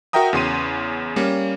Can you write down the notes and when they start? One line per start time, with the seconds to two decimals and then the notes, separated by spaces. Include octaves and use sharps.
0.13 F#4 A#4 E5 G5 A#5 D#6
0.33 E2 C#3 C6 D#7
1.16 G3 A#3 C#4